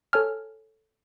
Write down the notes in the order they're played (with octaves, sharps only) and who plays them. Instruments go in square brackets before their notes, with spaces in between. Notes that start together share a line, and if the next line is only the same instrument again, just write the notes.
[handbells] A4 C#5 G#5 F6